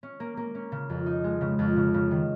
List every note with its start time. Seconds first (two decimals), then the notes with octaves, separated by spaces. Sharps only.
0.03 C#4
0.20 A#3
0.37 A#3
0.55 C#4
0.72 C#3
0.90 F2
1.06 D#4
1.24 G#3
1.41 C#3
1.59 F2
1.76 C#3
1.94 C#3
2.11 D#3